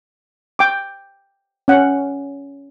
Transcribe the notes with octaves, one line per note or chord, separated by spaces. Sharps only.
G5 D6
C#4 F#5